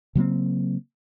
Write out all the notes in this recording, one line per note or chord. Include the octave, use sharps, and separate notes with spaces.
C#3 F#3 A#3 C4